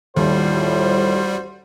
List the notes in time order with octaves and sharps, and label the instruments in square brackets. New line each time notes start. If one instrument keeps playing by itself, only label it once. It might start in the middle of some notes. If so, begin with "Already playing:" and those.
[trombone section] A1 F#4 C5 [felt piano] D#2 [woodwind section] A2 F3 [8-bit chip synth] G3